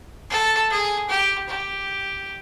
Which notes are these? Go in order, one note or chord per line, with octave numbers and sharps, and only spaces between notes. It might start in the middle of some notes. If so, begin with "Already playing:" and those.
A4
G#4
G4
G4